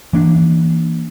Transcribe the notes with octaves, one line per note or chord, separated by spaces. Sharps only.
E3 A#3 D4